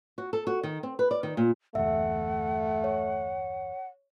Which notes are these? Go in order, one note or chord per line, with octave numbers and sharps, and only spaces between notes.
F#4
A4
F#4
D#3
C4
B4
D5
D#3
A#2
G1 E2 A3 E5 F#5
C#5